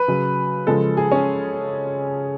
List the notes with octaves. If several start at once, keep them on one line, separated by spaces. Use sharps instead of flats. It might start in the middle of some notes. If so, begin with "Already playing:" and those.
Already playing: B4
C#3 F#3
C#3 F3 G#3 A4
G#4
C#4